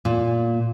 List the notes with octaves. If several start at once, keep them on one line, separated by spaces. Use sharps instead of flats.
A#2